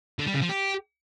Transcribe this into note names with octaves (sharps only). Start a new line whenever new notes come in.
D3
G3
C#3
F3
G4